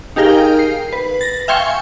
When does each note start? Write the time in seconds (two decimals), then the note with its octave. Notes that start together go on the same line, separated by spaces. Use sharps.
0.16 D#4 G4 G#4 A#4 F5 G5
0.59 C7
0.93 B4
1.21 A6 A#6
1.48 E5 F5 G5 G#5 C6 C#6